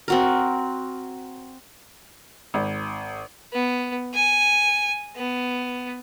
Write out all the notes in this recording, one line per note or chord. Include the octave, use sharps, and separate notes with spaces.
C4 F#4 A#4
G#1
B3
G#5
B3